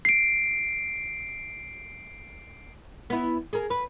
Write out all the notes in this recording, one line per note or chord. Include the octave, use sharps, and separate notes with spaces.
C7 D7
B3 E4
G#4 A#4
B4